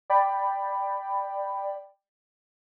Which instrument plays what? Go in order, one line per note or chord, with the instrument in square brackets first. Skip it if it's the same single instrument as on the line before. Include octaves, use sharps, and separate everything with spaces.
[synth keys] D5 G5 B5